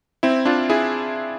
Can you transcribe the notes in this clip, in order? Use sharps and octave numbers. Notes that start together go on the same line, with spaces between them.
C4 E4
D4 F4
E4 G#4